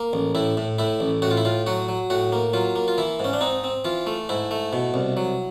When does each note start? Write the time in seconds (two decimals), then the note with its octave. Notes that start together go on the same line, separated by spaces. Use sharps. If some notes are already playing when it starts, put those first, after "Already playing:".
Already playing: A#3
0.13 A1
0.35 A2 E4
0.57 A2
0.79 A2 E4
1.00 A1
1.22 A2 F#4
1.31 F4
1.37 E4
1.45 A2 F4
1.66 F#3 F#4
1.88 F#3
2.10 A2 F#4
2.32 A#3
2.53 F#3 F4
2.76 A#3
2.88 F4
2.98 E3 E4
3.20 G#2 C#4
3.33 D4
3.41 C4 D#4
3.64 C4
3.85 E3 F4
4.07 A3
4.29 G#2 E4
4.51 A3
4.73 B2
4.94 C2
5.17 F#3